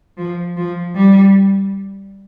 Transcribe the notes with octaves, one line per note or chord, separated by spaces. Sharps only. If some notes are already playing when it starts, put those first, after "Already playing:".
F3
F3
G3